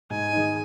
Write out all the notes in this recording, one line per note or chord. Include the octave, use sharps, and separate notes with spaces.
G#2 G#5
D#3 G#3 D#4